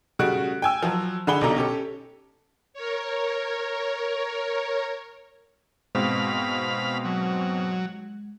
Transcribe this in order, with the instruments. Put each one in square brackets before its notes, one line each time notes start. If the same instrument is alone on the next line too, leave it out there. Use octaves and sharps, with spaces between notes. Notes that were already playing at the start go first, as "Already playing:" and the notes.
[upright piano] C#3 G3 A3 F#4 F#6 D7
G5 G#5 E6
F3 F#3
D3 G#4 F#5 B5 G7
B1 C3 D4 D#4 A4 A#5
C#4 G4 A4
[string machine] A#4 C#5
[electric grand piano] G#2 B2 C4 [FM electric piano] G#3 [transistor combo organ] F5 B5
[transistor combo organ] F#3